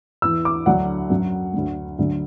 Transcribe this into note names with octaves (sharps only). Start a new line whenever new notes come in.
E2 E3 E6
D6
D2 D3 F#3 F#5
F#2 F#3
D2 D3 F#3
D2 D3 F#3